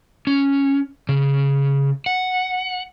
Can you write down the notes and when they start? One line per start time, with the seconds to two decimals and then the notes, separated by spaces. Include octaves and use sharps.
0.27 C#4
1.09 C#3
2.06 F#5